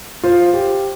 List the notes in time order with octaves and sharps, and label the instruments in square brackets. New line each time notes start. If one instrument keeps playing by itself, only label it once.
[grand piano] F4 C5
G4